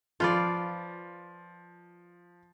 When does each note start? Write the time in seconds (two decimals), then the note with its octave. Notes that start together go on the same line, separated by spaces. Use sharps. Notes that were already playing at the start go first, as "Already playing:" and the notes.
0.20 F3 F4 B4 D5